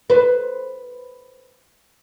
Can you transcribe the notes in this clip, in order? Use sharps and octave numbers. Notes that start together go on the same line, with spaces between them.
B4 C5